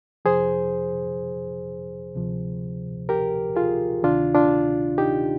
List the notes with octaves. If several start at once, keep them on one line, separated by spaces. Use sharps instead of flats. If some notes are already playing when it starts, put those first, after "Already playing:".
F2 C3 F3 G#4 C5
D2 C3 F3
G4 A#4
F4 G#4
D2 C3 D#3 D4 F4
D4 F4
D#4 G4